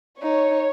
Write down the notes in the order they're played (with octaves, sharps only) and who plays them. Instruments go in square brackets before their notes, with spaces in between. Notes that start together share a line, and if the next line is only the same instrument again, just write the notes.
[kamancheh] D#4 [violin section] C#5